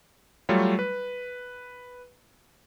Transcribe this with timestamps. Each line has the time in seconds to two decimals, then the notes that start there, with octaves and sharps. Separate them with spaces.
0.49 F#3 G3 A3 F4 C#5
0.79 B4